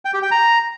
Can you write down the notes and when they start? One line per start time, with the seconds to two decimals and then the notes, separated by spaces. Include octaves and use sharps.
0.05 G5
0.14 G4
0.22 G5
0.31 A#5